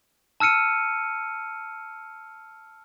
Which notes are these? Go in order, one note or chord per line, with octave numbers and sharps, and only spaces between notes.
A5 E6 F6 C#7 D#7